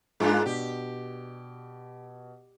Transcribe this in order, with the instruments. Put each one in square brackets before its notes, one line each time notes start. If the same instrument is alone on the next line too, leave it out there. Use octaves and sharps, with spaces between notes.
[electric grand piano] G#2 F4 G#5 [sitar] G#3 A#3 D4
[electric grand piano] B2 [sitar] G4